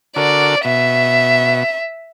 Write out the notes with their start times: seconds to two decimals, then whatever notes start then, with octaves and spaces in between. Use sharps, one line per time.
0.16 D3 F#4 A#4 D5
0.65 B2 E5